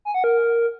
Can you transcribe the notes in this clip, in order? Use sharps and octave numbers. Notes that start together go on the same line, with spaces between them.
G#5
F#5
A#4